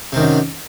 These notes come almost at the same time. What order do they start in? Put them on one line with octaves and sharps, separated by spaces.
C3 D#3 F#2